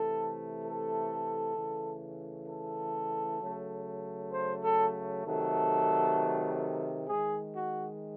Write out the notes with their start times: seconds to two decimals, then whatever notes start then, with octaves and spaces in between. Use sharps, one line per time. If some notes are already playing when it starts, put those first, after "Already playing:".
Already playing: C3 E3 A3 A4
0.64 A4
1.57 C#3 E3 A3
2.48 A4
3.41 C#3 F#3 A3
4.32 C5
4.64 A4
5.24 C3 D#3 F#3 A3 A4
7.08 D#3 G#3 G#4
7.55 F#4